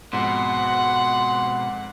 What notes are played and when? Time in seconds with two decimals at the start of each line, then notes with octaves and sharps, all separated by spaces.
0.13 F2 G#2 B2 F#5 C6